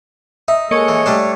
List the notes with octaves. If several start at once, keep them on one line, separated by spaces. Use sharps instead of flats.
D#4 E5
G#3 A#3 A4 C#5 D#5 C#7
E3
G3 A3 D4 D5